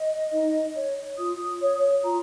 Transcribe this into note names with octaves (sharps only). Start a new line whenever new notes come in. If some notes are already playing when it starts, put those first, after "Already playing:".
Already playing: D#5
D#4
C#5
F4 D#6
C#5
F4 A#5